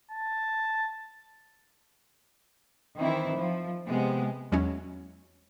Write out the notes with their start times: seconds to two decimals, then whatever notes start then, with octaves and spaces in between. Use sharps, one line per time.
0.11 A5
2.97 D#3 E3 C4 E4
3.37 F3
3.86 C3 G#3 B3
4.52 E2 F#3 G#3 C#4 E4